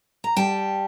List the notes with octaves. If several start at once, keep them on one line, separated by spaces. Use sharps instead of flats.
A#5
G3 G5 A5